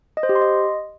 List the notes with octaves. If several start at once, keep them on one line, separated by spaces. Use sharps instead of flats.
D#5
C5
G4
C6
D#5